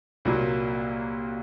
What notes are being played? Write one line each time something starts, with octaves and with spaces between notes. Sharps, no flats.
C2 A#2 F#3 A#3